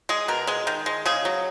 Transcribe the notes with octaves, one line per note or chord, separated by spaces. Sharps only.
G#3 G#4
B2 A#4
G#3 G#4
D#3
G#3
C#3 G#4
F#3